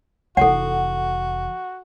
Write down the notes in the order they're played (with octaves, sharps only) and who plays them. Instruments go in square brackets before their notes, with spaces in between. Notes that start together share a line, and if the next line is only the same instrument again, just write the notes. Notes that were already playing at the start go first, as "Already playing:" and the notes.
[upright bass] F1 E3 [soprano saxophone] F#4 [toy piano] A4 F#5